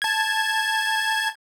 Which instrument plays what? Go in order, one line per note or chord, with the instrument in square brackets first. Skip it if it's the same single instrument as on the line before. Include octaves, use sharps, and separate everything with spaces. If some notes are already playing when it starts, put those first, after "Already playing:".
[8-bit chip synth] A5 G#6